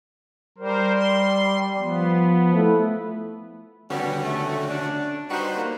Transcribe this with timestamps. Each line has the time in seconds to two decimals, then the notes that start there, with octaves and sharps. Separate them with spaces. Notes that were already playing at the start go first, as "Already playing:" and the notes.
0.58 G3 A#4 C5
0.94 C6
1.78 F3 B3
2.54 A3 E4
3.90 D3 G3 B3 C#4 F#4
4.24 A3
4.69 D4
5.30 G3 D#4 F#4 B4 C5
5.56 A#3